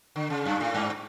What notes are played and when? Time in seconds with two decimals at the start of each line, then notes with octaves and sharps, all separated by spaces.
0.16 D3
0.30 C#3
0.45 F#2
0.60 A2
0.75 G2